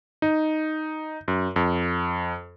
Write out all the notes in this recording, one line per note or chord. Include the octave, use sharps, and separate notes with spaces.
D#4
F#2
F2